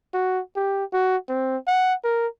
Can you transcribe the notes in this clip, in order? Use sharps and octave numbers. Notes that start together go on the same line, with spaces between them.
F#4
G4
F#4
C4
F#5
A#4